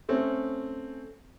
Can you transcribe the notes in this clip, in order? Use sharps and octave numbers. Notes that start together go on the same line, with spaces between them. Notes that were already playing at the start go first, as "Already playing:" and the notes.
A3 C4 C#4